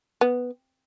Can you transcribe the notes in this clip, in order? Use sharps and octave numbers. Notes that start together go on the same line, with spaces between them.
B3